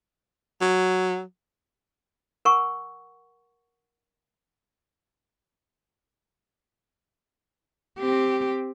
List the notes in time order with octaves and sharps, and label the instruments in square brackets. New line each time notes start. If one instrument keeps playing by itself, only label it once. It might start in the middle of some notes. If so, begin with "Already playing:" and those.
[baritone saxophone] F#3
[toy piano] A#4 F#5 G#5 C#6
[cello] C4 G4